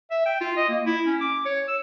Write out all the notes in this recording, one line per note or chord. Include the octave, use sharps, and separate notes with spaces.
E5
G5
F4
D#5
A#3
E4
C#4
D6
C#5
E6